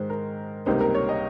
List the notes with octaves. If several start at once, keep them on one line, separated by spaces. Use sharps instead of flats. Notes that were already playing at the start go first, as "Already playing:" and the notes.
Already playing: G#2 D#3 G#3 C5
A#4
C#2 C3 G3 A#3 D#4 C5
A#4
C#5
D#5